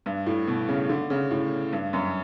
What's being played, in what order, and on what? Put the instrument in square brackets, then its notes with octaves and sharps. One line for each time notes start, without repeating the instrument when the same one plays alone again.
[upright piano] G2
A2
B2
C#3
D3
C#3
A2
G2
F#2